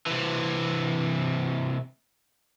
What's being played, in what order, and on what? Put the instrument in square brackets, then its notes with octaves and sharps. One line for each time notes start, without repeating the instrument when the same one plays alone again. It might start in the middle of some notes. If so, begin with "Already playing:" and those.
[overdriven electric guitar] C3 E3